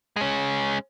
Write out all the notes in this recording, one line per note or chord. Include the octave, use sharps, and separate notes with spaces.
G#3 C#4